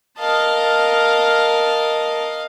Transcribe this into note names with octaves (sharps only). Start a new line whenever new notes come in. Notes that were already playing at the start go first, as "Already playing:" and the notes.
A#4 D#5 F5 A5